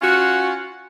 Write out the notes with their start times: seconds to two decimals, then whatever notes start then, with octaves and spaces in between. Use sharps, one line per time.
0.02 C#4 F4 F#4